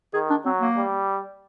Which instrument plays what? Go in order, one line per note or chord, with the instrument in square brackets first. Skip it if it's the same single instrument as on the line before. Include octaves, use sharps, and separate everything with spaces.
[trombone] D#3 [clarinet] G#4
[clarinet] D4
[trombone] F#3 [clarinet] C4
[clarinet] A#3
[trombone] G3